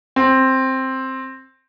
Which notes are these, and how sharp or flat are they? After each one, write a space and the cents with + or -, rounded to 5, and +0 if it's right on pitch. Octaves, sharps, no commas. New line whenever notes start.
C4 +5